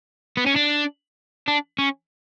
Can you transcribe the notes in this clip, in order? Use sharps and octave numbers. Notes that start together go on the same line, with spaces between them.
B3
C#4
D4
D4
C#4